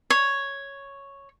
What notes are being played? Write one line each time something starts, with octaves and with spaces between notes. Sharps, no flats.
C#5